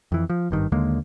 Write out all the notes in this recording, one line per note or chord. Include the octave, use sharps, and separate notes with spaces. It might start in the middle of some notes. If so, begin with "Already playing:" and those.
F2 E3
F3
G#1 G2 D#3
D#2 D3 G#3 A#3